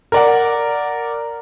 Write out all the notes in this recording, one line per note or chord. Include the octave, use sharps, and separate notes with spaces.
A#4 D5 F#5